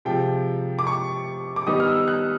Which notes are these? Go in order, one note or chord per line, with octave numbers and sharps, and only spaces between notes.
C3 F3 G#3 G5
D6
C#6
D6
D#3 G3 B3 D#4 D#6
F6
E6
F#6